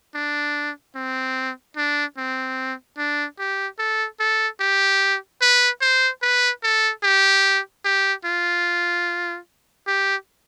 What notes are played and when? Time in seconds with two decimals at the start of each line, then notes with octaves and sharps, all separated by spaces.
0.14 D4
0.95 C4
1.77 D4
2.17 C4
2.97 D4
3.39 G4
3.79 A4
4.20 A4
4.60 G4
5.41 B4
5.81 C5
6.22 B4
6.63 A4
7.03 G4
7.85 G4
8.25 F4
9.87 G4